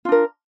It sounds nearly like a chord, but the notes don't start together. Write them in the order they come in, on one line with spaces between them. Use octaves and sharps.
F4 D4 A#4